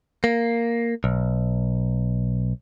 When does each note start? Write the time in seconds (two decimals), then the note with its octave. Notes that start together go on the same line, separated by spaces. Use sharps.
0.24 A#3
1.04 B1